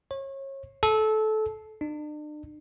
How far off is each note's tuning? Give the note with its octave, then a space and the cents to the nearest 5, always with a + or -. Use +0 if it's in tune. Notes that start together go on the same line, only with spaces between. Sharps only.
C#5 -30
A4 -20
D4 +40